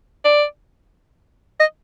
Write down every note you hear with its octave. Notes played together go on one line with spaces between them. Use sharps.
D5
D#5